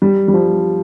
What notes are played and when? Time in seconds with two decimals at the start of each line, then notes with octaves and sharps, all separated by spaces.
0.02 G3
0.28 G3
0.34 F3